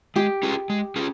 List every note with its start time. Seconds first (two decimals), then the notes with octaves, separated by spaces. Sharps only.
0.16 G#3 G4
0.43 C#4 F4 G#4
0.70 G#3
0.96 C#4 F4 G#4